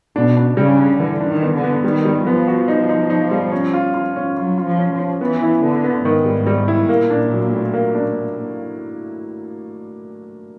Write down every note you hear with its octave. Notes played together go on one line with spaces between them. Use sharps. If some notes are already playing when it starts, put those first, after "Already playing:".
B2 D4
D4
C#3 G3
D4
D3 E3
D4
D#3
B3
D3
B3
D#3 G3
G3
F3 B3
F#4
D#4
D#4
D#4
G3
C#4
F4
F4
C#4
F#3 F4
F4
F3
C#4
F3
C#4
E3 B3
E4
D3 B3
B3
G#2 D#3
G3
G3
E4
A#2 A#3
D4
F#3
A2
A#3
D4